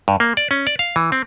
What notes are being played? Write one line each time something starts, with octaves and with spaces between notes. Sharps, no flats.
G2
A#3
D5
C#4
D5
F5
E3
C4